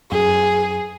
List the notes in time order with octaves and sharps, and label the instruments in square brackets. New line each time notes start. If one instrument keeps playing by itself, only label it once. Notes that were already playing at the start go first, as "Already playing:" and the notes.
[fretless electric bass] F#2 [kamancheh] G#4